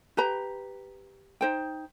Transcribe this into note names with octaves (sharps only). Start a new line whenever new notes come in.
G4 B4 A#5
D#4 C5 G5